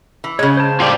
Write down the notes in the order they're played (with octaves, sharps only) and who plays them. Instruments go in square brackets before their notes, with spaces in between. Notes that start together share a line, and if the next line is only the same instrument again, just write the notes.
[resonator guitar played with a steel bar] E3
[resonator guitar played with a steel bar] C#3 G#3 [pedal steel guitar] C#5
[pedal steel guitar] C5 A5
[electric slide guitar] F4 G4 D5